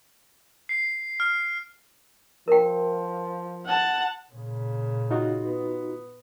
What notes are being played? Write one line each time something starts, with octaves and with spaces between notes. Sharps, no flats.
C7
F6
F3 A#4 G5
F#5 A5
A#2 C#3
D#4 F4 F#4
B3